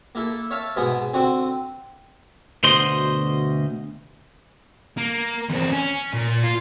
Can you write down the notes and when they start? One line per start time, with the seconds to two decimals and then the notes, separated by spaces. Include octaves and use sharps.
0.15 A#3 E4 A4
0.51 C#5 E5 F5 A5
0.76 G#2 B2 B3 G#4 G#5
1.14 D3 C4 F#4
2.64 D2 B2 C5 D#5 C6
4.98 A#3
5.49 E2 C4
5.72 C#4
6.14 A#2
6.43 F4